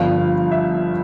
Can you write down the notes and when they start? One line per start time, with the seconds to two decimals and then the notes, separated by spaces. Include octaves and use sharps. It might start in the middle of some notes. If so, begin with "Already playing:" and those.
Already playing: G1 G2 F3 F5
0.51 E5